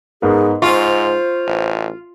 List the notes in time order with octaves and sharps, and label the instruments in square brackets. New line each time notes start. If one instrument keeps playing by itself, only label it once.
[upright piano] G#2 B3 A#4 [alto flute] G#4
[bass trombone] G#2 [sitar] F4 [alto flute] C5 [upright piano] C#6
[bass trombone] A1